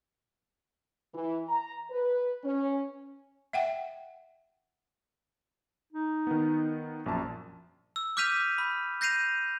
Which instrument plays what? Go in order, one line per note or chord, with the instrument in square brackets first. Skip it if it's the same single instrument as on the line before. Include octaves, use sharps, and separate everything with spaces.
[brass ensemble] E3
A#5
B4
C#4
[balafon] E5 F#5 G5
[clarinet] D#4
[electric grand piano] D#3 B3
A#1 F#2 A5
[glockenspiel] E6
D6 F6 G6 B6 D#7 F7
B5
G6 A#6 C7 D#7 F7